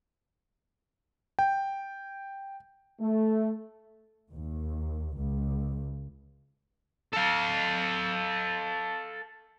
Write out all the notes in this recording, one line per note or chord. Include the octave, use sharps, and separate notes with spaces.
G5
A3
D#2
C#2
A4 F5